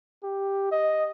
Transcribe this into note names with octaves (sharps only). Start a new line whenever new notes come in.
G4
D#5